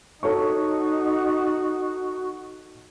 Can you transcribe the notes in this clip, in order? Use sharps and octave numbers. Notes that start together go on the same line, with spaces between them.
D#4 F#4 A4 C#5 C#6